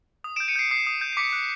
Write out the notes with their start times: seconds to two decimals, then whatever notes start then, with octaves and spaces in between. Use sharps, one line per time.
0.24 D#6
0.36 D7 E7
0.40 G6
0.48 C#7 D#7
0.56 G6 C7 D7
0.71 D#6 C7
0.87 D#6
1.01 G6
1.13 C7
1.17 D6 B6 C#7
1.33 F#6